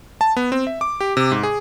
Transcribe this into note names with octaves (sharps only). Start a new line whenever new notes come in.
A5
B3
C4
E5
D6
G4
C3
G#2
G#4